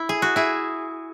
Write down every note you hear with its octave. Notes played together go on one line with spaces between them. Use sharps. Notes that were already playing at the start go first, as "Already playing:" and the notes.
Already playing: E4
G#4
F#4
E4 G#4